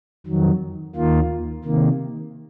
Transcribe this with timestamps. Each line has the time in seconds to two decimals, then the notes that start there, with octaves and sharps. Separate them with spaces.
0.26 F2 D#3 F#3
0.96 D#2 D#3 A#3 F4
1.65 C3 D#3 A#3